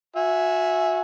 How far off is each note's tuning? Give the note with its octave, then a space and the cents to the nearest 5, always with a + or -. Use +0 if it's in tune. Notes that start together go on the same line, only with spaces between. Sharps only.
F#4 -30 E5 +0 G#5 +0